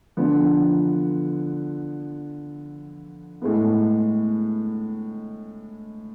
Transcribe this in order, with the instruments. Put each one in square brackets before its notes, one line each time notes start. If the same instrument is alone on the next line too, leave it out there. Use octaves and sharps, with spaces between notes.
[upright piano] D3 F3 B3
A2 G#3 B3